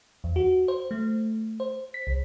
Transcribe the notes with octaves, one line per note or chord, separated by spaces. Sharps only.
E2
F#4
C5
A3
C5
B6
C2